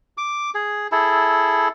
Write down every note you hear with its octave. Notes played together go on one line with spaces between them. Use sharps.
D6
G#4
E4 G#4 A4